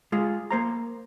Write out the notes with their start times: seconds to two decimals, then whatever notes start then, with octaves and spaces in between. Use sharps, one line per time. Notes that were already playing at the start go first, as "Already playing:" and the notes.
0.12 G#3 F4 G#4
0.51 A#3 C5 A#5